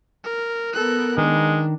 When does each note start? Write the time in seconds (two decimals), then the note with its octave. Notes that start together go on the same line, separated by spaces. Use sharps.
0.24 A#4
0.73 B3 A4 A#4 F#6
1.18 D#3 G#3 D4